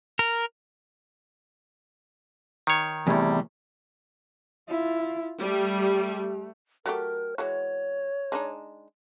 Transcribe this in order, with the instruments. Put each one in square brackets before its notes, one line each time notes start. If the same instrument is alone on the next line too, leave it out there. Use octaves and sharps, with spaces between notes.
[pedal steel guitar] A#4
[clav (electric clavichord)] D#3 C#5
[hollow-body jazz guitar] E2 A2 [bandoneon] C3 G3
[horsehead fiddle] E4 F4
[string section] G3 [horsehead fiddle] A3
[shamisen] F#3 A3 G4 [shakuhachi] A#4
[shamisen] E3 G#3 F#4 [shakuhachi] C#5
[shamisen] G#3 D4 D#4